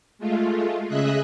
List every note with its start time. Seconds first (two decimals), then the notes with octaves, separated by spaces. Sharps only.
0.19 G#3 A3 F4
0.88 C#3 G#4 D#5 E5 F#6